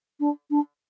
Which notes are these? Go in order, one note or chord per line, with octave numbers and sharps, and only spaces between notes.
D4
D4